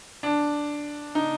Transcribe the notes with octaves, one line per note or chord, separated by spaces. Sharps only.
D4
D#4